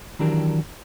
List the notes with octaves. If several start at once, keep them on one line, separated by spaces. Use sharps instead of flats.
D#3 E3 F#3 D4 G4 A#4